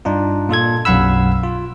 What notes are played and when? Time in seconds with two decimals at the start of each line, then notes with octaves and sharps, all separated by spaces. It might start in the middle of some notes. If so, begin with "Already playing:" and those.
0.05 G2 D4 D#4 F4
0.49 A#2 F4 A4 G#6
0.85 B1 F#2 F5 F#5 B5 E6
1.43 F4